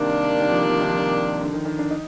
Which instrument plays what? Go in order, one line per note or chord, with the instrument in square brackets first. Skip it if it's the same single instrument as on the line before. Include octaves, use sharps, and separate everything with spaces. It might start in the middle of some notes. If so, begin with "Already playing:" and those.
Already playing: [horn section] C3 G3 A#3 D4 [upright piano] D#3
[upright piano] D#3
F3
D#3
F3
D#3
F3
D#3
D3
D#3
D#3
D4
D#4